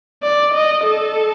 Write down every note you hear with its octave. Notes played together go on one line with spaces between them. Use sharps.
D5
D#5
A4